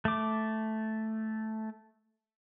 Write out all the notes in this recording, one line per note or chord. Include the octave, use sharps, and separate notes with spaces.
A3 D6